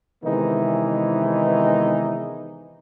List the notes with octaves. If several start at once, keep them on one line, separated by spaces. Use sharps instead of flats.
C3 D#3 E3 G#3 B3 D#4